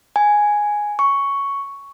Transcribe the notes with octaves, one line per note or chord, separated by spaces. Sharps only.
G#5
C#6